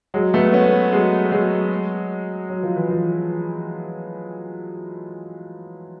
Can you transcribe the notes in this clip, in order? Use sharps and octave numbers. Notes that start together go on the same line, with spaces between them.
F#3 G#3
A3 B3
B3 C#4
F#3 G#3
F#3 G#3
F#3
F3
E3
F3